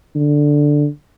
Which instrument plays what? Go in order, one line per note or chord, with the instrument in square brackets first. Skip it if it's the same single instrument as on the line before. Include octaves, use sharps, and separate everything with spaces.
[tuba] D3